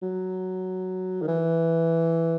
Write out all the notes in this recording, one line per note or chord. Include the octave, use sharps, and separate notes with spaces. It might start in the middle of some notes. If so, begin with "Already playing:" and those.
F#3
D#3
E3